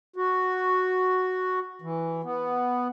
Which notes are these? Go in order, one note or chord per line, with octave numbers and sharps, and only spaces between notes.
F#4
E3
B3